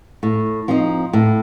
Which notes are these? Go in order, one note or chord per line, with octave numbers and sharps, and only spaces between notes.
A2
F3 C4 D#4
A2